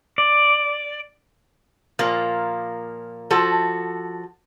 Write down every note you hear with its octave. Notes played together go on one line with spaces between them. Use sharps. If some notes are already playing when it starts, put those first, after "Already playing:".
D5
A#2 F3 A#3
F3 F#4 A4